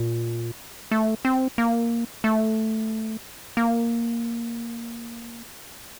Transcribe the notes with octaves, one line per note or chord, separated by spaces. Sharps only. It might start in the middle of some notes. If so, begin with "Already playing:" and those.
Already playing: A#2
A3
C4
A#3
A3
A#3